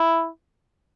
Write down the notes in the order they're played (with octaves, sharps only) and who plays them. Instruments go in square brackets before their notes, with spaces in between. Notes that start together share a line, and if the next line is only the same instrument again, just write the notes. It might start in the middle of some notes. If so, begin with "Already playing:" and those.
Already playing: [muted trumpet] E4